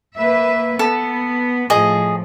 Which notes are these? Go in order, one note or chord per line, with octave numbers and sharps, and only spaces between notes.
A#3 B4 E5
B3 A4
A2 F3 G#4 D#5